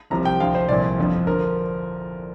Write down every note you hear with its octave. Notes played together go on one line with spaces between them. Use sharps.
C2 C3 F3 A#5
G5
D2 D3 F3 F5
C5
C2 A#2 F3 D5
G1 F2 D3 F3
D3 F3 A#4